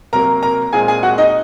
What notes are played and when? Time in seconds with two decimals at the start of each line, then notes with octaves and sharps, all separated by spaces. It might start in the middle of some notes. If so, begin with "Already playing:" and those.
0.13 C3 F#3 A#3 A#4 A#5
0.43 A#4 A#5
0.73 A#2 G#3 C4 G#4 G#5
0.88 G#4 G#5
1.03 F#4 F#5
1.18 D#4 D#5